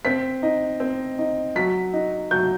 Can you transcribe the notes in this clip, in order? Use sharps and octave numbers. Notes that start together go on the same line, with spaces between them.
C4 B6
D#4
C4
D#4
F#3 B6
D#4
F#3 G6